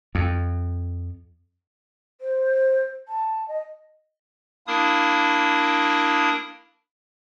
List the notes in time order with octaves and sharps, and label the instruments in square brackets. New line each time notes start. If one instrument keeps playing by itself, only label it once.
[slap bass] F2
[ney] C5
A5
D#5
[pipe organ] A#3 D4 E4 A#4 D#6